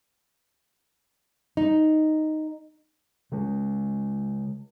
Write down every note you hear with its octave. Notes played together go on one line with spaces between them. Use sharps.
D#4
C#3 G#3